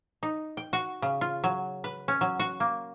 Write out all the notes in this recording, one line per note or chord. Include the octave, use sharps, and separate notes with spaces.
D#4
G5
F#4
C#3
F4
F#3
B4
C#4
F#3
F#4
A#3